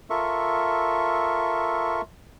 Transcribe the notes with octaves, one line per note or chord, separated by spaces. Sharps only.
F4 A4 A#4 E5 C#6